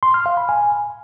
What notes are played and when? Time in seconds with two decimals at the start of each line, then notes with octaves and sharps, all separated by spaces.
0.03 C6
0.14 F6
0.26 F5
0.37 B5
0.49 G#5